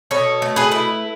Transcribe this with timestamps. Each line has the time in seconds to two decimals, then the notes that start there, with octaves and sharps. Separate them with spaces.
0.11 B2 A4 C#5
0.42 A3
0.56 G#4 B4
0.72 E4